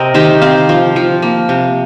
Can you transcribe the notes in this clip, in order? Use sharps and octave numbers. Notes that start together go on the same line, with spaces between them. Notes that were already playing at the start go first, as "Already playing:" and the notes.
Already playing: C3 C4 A#4 D#5
D#3 G4 C5
C4 C5 F5
F3
F3
A#3
C3